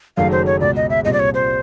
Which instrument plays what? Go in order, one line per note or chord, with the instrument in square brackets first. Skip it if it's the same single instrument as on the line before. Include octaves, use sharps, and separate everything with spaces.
[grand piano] F#1 F#2 D#3 F#3 A3 [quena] F5
[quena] C5
C#5
[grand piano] C#2 B2 G#3 [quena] D5
[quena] D#5
E5
[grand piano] C2 A#2 G3 C4 [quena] D#5
[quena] D5
C#5
C5